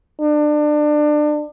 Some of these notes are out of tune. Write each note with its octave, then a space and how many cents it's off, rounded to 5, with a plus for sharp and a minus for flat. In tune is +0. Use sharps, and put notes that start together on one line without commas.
D4 +25